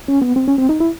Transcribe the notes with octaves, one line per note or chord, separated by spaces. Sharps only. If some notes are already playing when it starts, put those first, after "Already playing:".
C#4
B3
C4
C#4
C4
D#4
E4